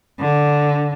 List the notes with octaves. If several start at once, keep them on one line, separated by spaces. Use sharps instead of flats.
D3